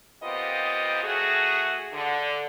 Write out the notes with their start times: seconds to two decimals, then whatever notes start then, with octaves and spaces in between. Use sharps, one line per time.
0.22 A#2 B3 C4 F4 G4 D#5
1.03 A3 F#4 G#4
1.93 D3